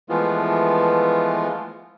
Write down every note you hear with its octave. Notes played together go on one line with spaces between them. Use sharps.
E3 F3 G#3 A3 B3 F4